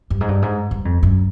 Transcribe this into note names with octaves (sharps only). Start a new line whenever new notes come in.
G2
G#2
G2
G#2
G2
F2
F#2